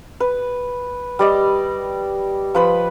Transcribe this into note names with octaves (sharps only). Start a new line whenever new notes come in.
B4
G3 D5 D#5
F3 B4 B5